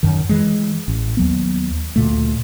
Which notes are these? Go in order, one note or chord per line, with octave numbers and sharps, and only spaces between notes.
F#2 D#3
E3 G#3
A1
D#2 F#3 B3
D2 A#2 A3